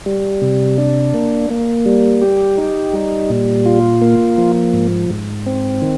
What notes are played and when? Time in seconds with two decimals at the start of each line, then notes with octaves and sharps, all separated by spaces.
0.06 G3
0.42 C3
0.78 D4
1.14 A#3
1.50 A#3
1.86 G3
2.22 G4
2.58 D#4
2.93 G3
3.30 A#2
3.66 F4
4.02 A#3
4.38 F3
4.74 G#2
5.10 G#2
5.46 C4
5.82 D#3